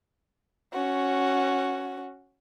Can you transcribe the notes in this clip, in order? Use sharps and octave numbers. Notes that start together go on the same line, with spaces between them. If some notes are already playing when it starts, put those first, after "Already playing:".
C#4 F#4